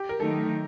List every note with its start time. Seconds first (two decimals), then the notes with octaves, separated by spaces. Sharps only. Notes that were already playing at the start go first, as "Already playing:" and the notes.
Already playing: G4
0.09 A#4
0.20 D#3 F#3 A3 D#4 A4